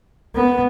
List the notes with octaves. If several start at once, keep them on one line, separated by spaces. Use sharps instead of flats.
B3